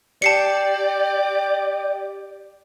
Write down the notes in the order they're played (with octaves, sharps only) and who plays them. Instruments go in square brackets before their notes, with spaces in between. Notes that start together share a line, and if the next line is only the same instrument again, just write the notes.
[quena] G4 [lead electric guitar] D5 [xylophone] A5 C7 C#7